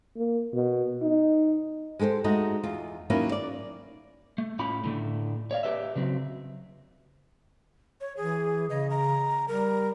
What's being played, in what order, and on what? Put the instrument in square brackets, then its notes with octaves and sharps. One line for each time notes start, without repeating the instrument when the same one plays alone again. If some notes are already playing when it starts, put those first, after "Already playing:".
[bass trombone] A#3
B2
D#4
[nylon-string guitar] G#3 G4 A4 B4 C5
G#3 A3 D#4 F#4 G#4
E2 F4
D#3 F#3 A#3 B3 C#4 E4
D5
[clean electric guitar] A3
A2 C#4 F4 B5
A2 D3 F#3 A3
C#5 D5 F5
G4 B4 D#5 E5
C#3 F#3 C4
[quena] C#5
[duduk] E3 [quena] G#4
[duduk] C#3 [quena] D#5
[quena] A#5
[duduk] G3 [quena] A#4